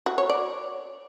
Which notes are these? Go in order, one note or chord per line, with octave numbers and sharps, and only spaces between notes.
F#4
C#5
D5